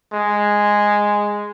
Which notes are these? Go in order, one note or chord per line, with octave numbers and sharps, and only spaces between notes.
G#3